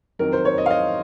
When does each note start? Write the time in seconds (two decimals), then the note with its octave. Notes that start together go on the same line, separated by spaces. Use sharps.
0.19 F2 D#3 F#3 A#4
0.33 C5
0.45 C#5
0.58 D#5
0.66 F5
0.71 D#5